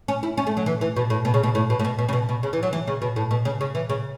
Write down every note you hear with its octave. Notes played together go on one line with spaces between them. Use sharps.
C#4
E4
C#4
A3
F#3
E3
E3
B2
A2
B2
C#3
B2
A2
B2
A2
B2
B2
C#3
B2
B2
C#3
E3
F#3
E3
C#3
B2
A2
B2
C#3
C#3
E3
C#3